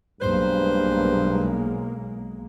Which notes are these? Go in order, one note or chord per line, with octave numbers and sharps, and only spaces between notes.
B1 G2 G#3 A#3 B4 C5